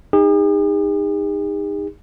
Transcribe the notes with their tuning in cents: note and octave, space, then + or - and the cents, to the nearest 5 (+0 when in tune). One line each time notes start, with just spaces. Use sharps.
D#4 +0 G#4 -45